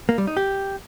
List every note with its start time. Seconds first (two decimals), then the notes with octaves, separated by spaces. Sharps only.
0.09 A#3
0.18 G3
0.27 D#4
0.37 G4